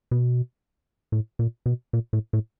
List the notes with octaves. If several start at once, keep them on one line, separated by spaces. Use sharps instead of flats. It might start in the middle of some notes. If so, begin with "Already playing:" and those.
B2
A2
A#2
B2
A#2
A2
A2